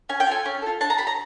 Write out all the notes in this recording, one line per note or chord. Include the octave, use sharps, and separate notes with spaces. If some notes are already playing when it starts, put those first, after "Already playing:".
C#4 G#5
G5
F4 A4 G#5
C#4
F4 A4
D4 A5
A#5
G4 B5
A#5